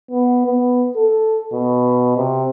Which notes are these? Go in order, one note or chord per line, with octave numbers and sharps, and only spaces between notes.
B3
B3
A4
B2
C3